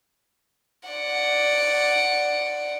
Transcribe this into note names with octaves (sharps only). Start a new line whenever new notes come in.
D5 F#5